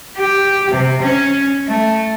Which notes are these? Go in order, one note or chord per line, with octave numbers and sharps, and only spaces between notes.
G4
C3
C#4
A3